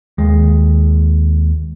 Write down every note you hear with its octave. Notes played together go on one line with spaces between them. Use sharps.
D#2 G#3